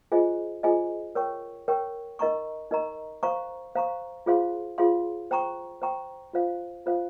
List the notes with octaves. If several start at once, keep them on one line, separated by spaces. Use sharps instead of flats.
F4 G#4 C5 D#5 G#5
F4 G#4 C5 D#5 G#5
A#4 C#5 G5 C#6
A#4 C#5 G5 C#6
D#4 A#4 D#5 A#5 C#6
D#4 A#4 D#5 A#5 C#6
C5 F5 A#5 C#6
C5 F5 A#5 C#6
F4 G#4 C5 F5 C6
F4 G#4 C5 F5 C6
C5 G5 A#5 C#6
C5 G5 A#5 C#6
F4 C5 F5
F4 C5 F5